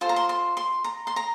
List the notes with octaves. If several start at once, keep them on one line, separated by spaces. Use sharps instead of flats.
F4 A4 C5 C6
A#5
C6
C6
C6
A#5
C6
A#5